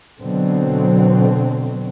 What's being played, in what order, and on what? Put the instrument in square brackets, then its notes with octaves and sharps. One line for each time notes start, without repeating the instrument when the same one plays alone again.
[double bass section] B2 D3 F#3 C4